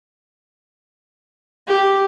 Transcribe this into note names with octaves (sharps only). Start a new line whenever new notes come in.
G4